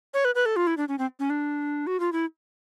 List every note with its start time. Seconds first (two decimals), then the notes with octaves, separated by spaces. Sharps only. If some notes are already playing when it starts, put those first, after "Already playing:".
0.14 C#5
0.25 B4
0.35 B4
0.46 A4
0.56 F4
0.67 E4
0.77 D4
0.88 C#4
0.99 C4
1.19 C#4
1.30 D4
1.87 F#4
2.00 F4
2.12 E4